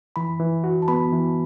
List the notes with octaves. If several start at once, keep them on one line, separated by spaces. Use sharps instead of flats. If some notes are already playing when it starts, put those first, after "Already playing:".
E3 B5
E3
F#4
A5
B3 B5
E3